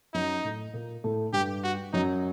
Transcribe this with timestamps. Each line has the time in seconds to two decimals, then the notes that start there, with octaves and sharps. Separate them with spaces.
0.14 F#2 F#3 D#4
0.44 A2 A3
0.73 A#2 A#3
1.04 A2 A3
1.33 G2 G3 G4
1.64 F#4
1.93 F#2 F#3 D#4